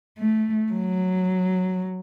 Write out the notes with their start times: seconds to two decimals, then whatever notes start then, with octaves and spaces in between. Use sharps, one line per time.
0.19 A3
0.73 F#3